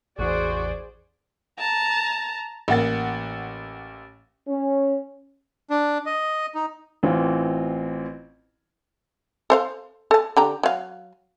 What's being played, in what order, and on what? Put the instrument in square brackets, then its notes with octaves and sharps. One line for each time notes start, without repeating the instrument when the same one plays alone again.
[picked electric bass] A1 E2 [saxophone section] F#4 [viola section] G#4 C5 [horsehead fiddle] D5
[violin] A5 A#5
[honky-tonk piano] A1 A#3 F#5 A6
[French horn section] C#4
[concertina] D4
D#5
D#4
[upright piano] A1 E3 C4 F4
[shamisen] A4 C5 F5
A4 A5
D3 G4 A#5
F#3 F5